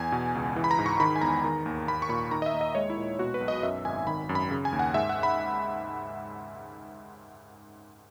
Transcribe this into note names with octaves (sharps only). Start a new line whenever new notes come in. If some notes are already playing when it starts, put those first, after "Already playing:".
Already playing: E2 G#5
B2
C#2
E3
B5
A#5
G#2
C#6
D#3 B5
G#5
E2 A#5
D#3
D#2
A#3 B5
C#6
A#2 B5
D#3 A#5
D#5
E5
D#2
D#5
G#3 C#5
E4
A#2
B2 F#4
B4
B1
D#5
F#2 E5
G#1 G#5
D#3 B5
F#2
B5
C#3
G#5
D#2
F#5
G#2 E5
F#5
B5